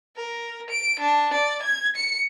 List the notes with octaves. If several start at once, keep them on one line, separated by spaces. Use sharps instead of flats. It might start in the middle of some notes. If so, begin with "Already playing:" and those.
A#4
D7
D4
D5
G#6
C#7